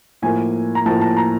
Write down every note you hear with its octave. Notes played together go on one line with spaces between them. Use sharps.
A2 F3 A#3 G#5
A#5
A2 F3 A#3 A5
A5
A#5